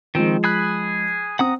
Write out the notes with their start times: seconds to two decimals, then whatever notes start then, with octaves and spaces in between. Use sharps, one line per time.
0.15 D#3 F3 G#3 C4
0.44 G#4 B5 F#6
1.39 C4 F#5 A#5 D#6